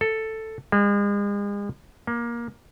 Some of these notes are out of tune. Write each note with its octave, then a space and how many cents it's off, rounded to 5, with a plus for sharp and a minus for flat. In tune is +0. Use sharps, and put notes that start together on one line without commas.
A4 +5
G#3 -40
A#3 +20